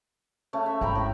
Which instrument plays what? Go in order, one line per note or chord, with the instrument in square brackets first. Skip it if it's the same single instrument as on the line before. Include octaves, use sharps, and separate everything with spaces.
[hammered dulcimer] C#3 A3
E5
[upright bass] G#1 [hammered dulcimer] G5 A#5 B5
[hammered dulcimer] A2